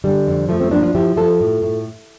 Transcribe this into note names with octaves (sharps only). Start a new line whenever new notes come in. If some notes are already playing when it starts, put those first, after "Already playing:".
D3 G3
F2
F3 A3
A3 C4
F3 A#3 D4
D4 F4
F3 E4 G4
F3 F4 A4
A2
A2